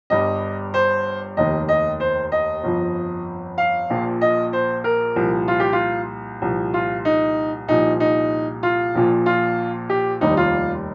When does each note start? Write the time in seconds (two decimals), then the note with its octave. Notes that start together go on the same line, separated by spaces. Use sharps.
0.10 G1 G2 G3 D#5
0.74 C5
1.37 F1 D#2 D#3 D#5
1.69 D#5
2.00 C5
2.32 D#5
2.63 G1 F2 F3
3.58 F5
3.90 A#1 A#2 F3
4.21 D#5
4.53 C5
4.84 A#4
5.16 C2 A#2 F3
5.48 F4
5.60 G4
5.73 F4
6.42 C2 A#2 F3
6.74 F4
7.05 D#4
7.68 C2 A#2 F3 D#4
8.00 D#4
8.63 F4
8.95 A#1 A#2 F3
9.26 F4
9.90 G4
10.21 F1 D#2 D#3 G3 D#4
10.37 F4